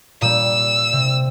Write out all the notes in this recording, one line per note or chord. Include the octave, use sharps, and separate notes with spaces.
A#2 G3 E6
C3